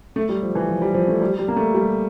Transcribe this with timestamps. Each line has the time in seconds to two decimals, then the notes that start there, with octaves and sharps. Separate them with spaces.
0.16 A3
0.29 G3
0.42 F3
0.55 E3
0.69 F3
0.82 G3
0.94 F3
1.08 A3
1.21 G3
1.39 G3
1.48 A#3
1.56 A3
1.74 G3